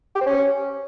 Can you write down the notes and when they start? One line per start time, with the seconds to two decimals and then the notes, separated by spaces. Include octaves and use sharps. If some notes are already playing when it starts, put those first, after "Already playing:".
0.15 G4
0.21 C5
0.26 C#4